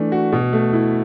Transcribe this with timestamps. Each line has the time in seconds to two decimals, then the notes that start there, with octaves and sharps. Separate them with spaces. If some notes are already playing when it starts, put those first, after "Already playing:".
Already playing: E3 A3 D4
0.12 F#4
0.32 B2
0.53 A3
0.73 E4